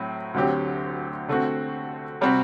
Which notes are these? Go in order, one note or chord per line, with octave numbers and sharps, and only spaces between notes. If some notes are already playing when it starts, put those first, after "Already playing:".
Already playing: A2 F#3 C4
D2 D3 F#3 C4 G4
D3 A3 C4 F#4
C3 G3 C4 F#4